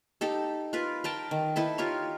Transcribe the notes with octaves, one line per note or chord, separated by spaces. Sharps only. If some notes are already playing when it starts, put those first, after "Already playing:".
D#4 G4 A4
F4 A#4 B4
A#4 G5 A5
D#3
D#4 E4 A4 B4
F4 G4 A#4 C#5